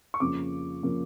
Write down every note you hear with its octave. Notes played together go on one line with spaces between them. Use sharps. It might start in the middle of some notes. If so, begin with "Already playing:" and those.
C#6
F2 C#3 F3 A#3 D6
C#3 F3 A#3